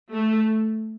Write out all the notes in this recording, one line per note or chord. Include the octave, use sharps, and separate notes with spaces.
A3